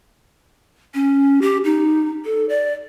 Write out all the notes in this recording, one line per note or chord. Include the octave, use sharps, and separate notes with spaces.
C#4
G4
D#4
A4
D5